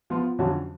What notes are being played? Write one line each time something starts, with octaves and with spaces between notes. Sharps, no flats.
F3 B3 F4
F2 D3 F#3 C#4 F#4